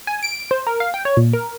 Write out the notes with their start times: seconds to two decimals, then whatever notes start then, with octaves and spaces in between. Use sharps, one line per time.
0.07 G#5
0.23 D7
0.51 C5
0.67 A#4
0.80 F5
0.94 G5
1.05 C#5
1.17 A#2
1.33 A#4